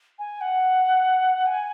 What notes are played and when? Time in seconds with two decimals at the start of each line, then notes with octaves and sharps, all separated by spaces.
0.19 G#5
0.41 F#5
1.47 G#5